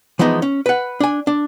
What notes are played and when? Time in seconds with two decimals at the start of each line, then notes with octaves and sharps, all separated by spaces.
0.19 E3 F3 G#3 B3 D#4
0.42 C#4
0.66 B4 F#5
1.00 D4 G#5
1.27 D4